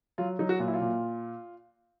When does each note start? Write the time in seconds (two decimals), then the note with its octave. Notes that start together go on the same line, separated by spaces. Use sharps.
0.18 F#3 F4
0.39 F#3 D#4
0.49 F#4
0.59 A#2 F4
0.68 E4
0.74 F4
0.81 A#2